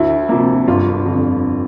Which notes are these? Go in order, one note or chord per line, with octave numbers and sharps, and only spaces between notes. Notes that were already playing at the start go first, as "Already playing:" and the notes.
Already playing: D2 E4
C3 F3 A#3
G1 F4
F2 D3